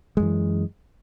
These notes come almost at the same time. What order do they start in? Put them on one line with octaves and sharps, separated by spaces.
G#3 F#2 E3